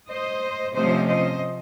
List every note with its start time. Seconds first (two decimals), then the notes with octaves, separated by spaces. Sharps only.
0.10 C5 D#5
0.75 C3 F3 A3 C#4 C5 D#5
1.08 C5 D#5